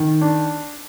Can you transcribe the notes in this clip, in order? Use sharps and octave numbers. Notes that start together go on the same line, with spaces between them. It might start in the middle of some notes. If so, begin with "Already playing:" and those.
Already playing: D#3
D4